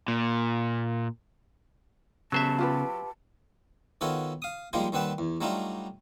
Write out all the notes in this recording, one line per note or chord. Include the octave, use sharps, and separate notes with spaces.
A#2
C#3 F#3 B3 C5 E5 A5
F4 G4 B4
D#3 B3 F4 F#4 A4 C#5
F5 D#6
F3 G3 G#3 A#3 D#4 F4
D#2 G3 C4 B4 F#5 A5
E2
F#3 G3 A3 D4 D#4 F4